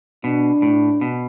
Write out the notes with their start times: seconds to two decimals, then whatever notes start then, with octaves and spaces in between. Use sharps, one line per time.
0.24 B2 D4
0.62 A2
1.01 B2